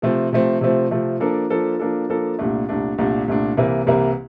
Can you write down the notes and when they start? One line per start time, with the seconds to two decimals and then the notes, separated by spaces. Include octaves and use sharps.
0.02 C3 F3 A3 C4
0.32 C3 F3 A3 C4
0.61 C3 F3 A3 C4
0.91 C3 F3 A3 C4
1.20 F3 A#3 D4 A4
1.50 F3 A#3 D4 A4
1.79 F3 A#3 D4 A4
2.09 F3 A#3 D4 A4
2.39 C2 A#2 A3 D4
2.69 C2 A#2 A3 D4
2.98 C2 A#2 A3 D4
3.28 C2 A#2 A3 D4
3.56 C2 C3 E3 A#3 E4
3.87 C2 C3 E3 A#3 E4